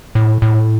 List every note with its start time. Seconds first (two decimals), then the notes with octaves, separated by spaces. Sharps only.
0.15 A2
0.42 A2